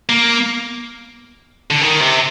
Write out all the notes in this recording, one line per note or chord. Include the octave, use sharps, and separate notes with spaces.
A#3
D3
D#3
C3